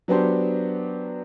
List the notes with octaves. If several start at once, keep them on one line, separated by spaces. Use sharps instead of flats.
F#3 B3 D4 G4 C5